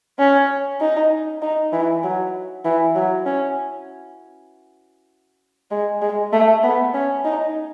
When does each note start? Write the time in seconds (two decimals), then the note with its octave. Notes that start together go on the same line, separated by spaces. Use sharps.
0.19 C#4
0.81 D#4
1.42 D#4
1.73 E3
2.04 F#3
2.65 E3
2.95 F#3
3.26 C#4
5.71 G#3
6.02 G#3
6.33 A3
6.63 B3
6.94 C#4
7.25 D#4